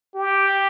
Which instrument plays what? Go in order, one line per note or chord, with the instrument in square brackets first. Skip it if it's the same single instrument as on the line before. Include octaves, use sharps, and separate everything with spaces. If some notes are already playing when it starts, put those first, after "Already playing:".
[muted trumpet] G4